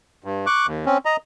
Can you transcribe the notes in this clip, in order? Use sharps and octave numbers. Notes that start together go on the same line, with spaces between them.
G2
C#6 D6 F#6
D#2
C4 C#4
D#5 A#5